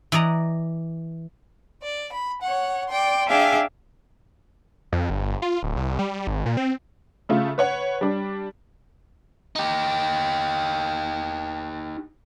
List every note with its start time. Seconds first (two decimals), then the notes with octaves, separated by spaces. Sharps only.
0.12 E3 D5 D#5 A#5
1.83 D5
2.12 B5
2.42 C#5 F#5
2.91 D5 G5 C6
3.27 D4 G#4 E5 F5 G5 G#5
4.92 F2
5.10 G1
5.42 F4
5.63 D1
5.77 C2
5.99 G3
6.27 G#1
6.46 A#2
6.57 C4
7.29 C#3 A3 F4
7.58 B4 C#5 F#5
8.01 G3 D4
9.56 D#4 G4